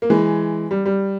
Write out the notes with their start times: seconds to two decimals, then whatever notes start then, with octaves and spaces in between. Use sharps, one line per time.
0.02 A#3
0.10 E3 G#3
0.71 G3
0.85 G3